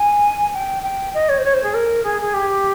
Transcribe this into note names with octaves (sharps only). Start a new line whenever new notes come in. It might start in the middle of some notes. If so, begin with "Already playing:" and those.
Already playing: G#5
G5
G5
D#5
C#5
C5
C#5
C5
G#4
A#4
G#4
G#4
G4